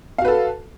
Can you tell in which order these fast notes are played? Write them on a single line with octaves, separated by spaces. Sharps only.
F5 F#4 B4 A4